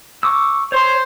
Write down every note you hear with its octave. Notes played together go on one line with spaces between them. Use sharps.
C#6 D6 E6
C5 C#5